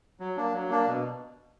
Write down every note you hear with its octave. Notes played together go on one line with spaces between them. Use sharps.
F#3
A#3 D4
F#3
A#3 D4
B2